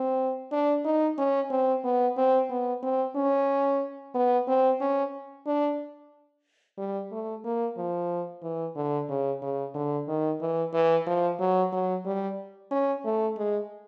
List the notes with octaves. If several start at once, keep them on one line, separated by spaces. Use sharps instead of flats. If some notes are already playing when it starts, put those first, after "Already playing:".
Already playing: C4
D4
D#4
C#4
C4
B3
C4
B3
C4
C#4
B3
C4
C#4
D4
G3
A3
A#3
F3
E3
D3
C#3
C#3
D3
D#3
E3
E3
F3
F#3
F#3
G3
C#4
A3
G#3